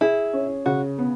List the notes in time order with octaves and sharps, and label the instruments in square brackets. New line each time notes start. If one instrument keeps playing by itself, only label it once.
[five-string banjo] E4 [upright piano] G#4
[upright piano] C#4
[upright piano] C#3 [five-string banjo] F#4
[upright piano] B3